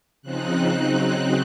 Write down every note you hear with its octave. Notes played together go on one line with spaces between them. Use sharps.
C#3 F3 C4 D#4 F#6
C#3 F#3 C4 D#4